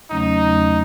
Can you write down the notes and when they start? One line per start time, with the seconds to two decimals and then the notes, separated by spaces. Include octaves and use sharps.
0.10 E2 C#3 F#3 A3 C#4 D#4
0.43 E2 C#3 F#3 A3 C#4